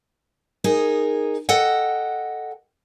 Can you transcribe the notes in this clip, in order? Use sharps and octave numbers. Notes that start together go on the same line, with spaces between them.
D#4 G#4 A#4
A4 D#5 F#5 G5